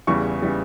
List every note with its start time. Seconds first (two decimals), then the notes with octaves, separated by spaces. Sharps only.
0.07 E2 C#3 E3 G3 C#6
0.42 C#3 E3 G3